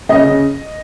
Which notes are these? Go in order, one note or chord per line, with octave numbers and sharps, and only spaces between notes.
C#3 D#5
C#3